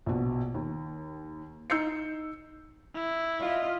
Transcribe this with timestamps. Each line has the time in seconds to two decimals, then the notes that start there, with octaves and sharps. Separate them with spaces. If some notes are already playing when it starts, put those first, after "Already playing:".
0.06 A#1 B2
0.54 D#2
1.70 D#4 E6 G6 C7 C#7
2.95 E4
3.41 F4 D#5 E5